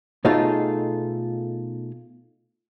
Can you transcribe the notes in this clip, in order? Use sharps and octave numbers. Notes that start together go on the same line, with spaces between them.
B2 A3 D#4 F4 G#4 A4